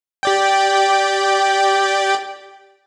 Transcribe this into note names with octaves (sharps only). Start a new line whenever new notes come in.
G4 D5 G5